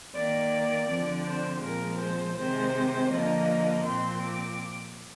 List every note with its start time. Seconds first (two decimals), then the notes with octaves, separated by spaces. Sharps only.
0.15 D#3 A#3 D5
0.89 D3 F3 C4
1.25 C5
1.63 A#2 F3 G#3 C4 A#4
1.99 C5
2.37 C3 D#3 G#3 C5
3.11 D3 F3 A#3 D#5
3.85 A#2 F3 C4 C6
4.22 D6